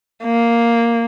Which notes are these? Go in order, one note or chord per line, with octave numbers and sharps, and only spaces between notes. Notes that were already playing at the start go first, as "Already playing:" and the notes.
A#3